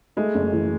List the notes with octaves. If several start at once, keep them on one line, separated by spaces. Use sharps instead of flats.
G#3 A3
F#1
E3